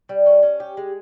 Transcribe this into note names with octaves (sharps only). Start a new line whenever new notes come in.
G3
C#4
C#4
G4
G#3